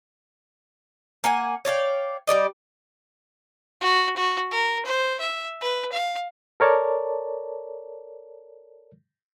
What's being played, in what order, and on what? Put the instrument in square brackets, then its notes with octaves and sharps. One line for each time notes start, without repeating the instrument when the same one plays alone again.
[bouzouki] A#3 F#5 G#5
C#5 D5 F5 G5
G3 G#3 D5 D#5
[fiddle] F#4
F#4
A#4
C5
E5
B4
F5
[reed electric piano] A4 A#4 C#5 D5 A5